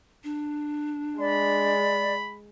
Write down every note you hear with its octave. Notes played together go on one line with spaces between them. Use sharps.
D4
G#3 D5 B5